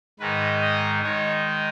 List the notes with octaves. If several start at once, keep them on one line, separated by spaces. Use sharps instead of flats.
G#2 D#3 G#3 D#4 B4
D#5
D#3 G#3 D#4 C#5